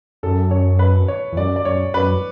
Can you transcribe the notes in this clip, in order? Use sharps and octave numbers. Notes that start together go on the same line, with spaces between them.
F#2 A4
C#5
B4
C#5
E2
F#2 D5
D5
F#2 C#5
F#2 B4